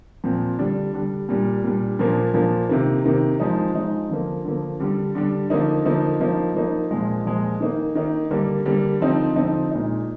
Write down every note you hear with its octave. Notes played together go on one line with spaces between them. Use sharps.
A#2 F3 C4
D3 G3 D4
D3 G3 D4
A#2 G3 D4
A#2 G3 D4
A#2 F3 A#3 D4
A#2 F3 A#3 D4
C3 D#3 A#3
C3 D#3 A#3
F3 G#3 D#4
F3 G#3 D#4
D3 F3 A#3
D3 F3 A#3
D3 G3 D4
D3 G3 D4
D3 F3 A#3 D#4
D3 F3 A#3 D#4
F3 A#3 D#4
F3 A#3 D#4
A#2 F3 G#3
A#2 F3 G#3
D#3 A#3 D#4
D#3 A#3 D#4
D3 G3 A#3 D4
D3 G3 A#3 D4
D3 F3 C4 D#4
D3 F3 C4 D#4
A#2 G#3 D#4